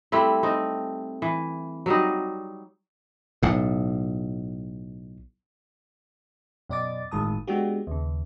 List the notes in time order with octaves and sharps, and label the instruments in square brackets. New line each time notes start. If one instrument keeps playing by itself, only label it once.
[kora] G3 A3 C4 E4
C4 D#4
E3
F#3 G3 D#4
[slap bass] B1 A2
[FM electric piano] F#2 B2 D5 D#5 D6 A6
G1 A2 D#3 G#3 A5 D#6
G#3 B3 D4 F#4 G4
D#2 C#3